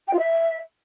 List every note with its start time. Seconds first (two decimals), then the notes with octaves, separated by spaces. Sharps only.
0.07 G5
0.13 F4
0.19 E5